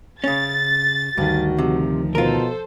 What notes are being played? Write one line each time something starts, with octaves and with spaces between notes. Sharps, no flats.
C#3 C#4 A6
D2 G2 D#3 F#4
C3 F3
B2 F4 A4 A#4 C5